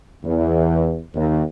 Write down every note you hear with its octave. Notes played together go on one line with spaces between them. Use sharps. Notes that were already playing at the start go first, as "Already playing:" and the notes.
E2
D#2